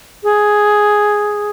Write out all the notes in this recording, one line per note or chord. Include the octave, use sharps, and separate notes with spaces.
G#4